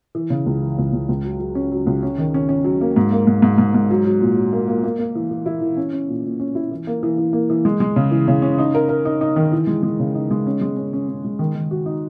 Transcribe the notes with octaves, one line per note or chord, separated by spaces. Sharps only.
E3
C#3
C#2
E3
C#2
C#2
C#2
F#3
F#3
C#4
F#3
C#2
C#4
D#3
C#4
C#4
F#3
A#3
G#2
A#3
G#2
G#2
G#2
G#2
F#3
F#3
A#2
F#3
A#3
A#3
A#3
A#3
E3
E3
E4
E3
C#4
C#4
A#2
A#2
C#4
E4
E3
A#3
E3
E3
A#3
E3
G#3
G#3
C#3
E3
C#3
C#4
D#4
A#4
A#4
D#4
D#4
D#3
E3
G#3
G#3
C#3
D#4
G#3
C#4
G#3
C#4
C#4
C#4
G#3
D#3
D#3
F#4
D#4